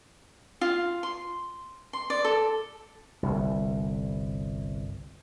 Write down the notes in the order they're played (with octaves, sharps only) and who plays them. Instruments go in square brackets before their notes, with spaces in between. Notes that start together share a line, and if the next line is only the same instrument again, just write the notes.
[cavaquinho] F4
C6
C6
D5
A4
[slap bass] G1 C2